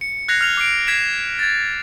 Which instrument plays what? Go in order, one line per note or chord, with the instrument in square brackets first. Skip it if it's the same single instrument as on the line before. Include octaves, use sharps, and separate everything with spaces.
[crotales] C#7
F#6 G#6 A#6 C7 F7
F6 F7
D6 C7 D7
G#6 B6 C7 E7
G#6 A6